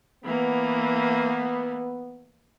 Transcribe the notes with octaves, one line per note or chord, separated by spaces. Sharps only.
E3 A#3 B3